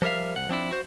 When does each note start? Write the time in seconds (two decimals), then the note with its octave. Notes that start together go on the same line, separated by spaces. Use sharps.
0.02 F3 G3 A#4 E5 F5
0.36 C2 F#5
0.49 F3 C4 D4 E4
0.71 F#4 C5